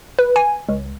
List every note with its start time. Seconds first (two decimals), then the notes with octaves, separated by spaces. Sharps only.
0.19 B4
0.36 G#5
0.69 C#2